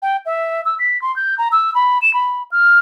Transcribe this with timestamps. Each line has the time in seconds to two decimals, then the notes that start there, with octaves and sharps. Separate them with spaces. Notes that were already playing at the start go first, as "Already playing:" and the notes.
0.02 G5
0.26 E5
0.65 E6
0.79 B6
1.02 C6
1.16 G6
1.38 A#5
1.52 E6
1.75 B5
2.02 E7
2.14 B5
2.52 F6